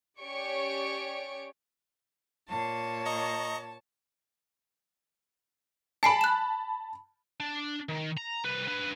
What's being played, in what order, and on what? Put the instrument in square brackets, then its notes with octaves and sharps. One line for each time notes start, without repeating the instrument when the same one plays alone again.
[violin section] C#4 G4 C#5 D5 C#6 D7
[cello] A#2 C#5 [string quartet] A5
[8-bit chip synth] D#5 A#5 C#6
[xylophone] G#5 C7 D7 [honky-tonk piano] A5 B5
[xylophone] F#6 E7
[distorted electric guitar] D4
D#3
A#5
C2 B4
D4 B4